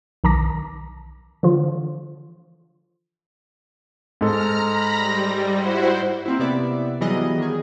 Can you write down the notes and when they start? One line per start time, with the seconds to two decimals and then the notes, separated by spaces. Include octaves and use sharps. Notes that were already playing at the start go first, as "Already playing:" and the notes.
0.24 B1 D#3 A5 A#5 D6 A#6
1.43 D3 E3 F3 F4
4.21 G#2 A4 A#5 F6
4.65 A#5 B5 A#6
4.96 G3
5.54 E4 F#4 C5
6.26 A#3 C4 E4
6.39 C3 B3 E4 D5 E5
7.01 E3 F#3 G3 B3 G#4 D#5
7.38 D#3 G#4